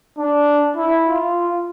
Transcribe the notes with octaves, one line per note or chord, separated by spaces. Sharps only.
D4
E4
F4